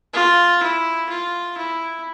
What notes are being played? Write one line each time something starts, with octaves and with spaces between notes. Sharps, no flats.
F4
E4
F4
E4